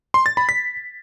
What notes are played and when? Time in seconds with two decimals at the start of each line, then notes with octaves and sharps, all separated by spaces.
0.14 C6
0.26 A6
0.37 B5
0.49 B6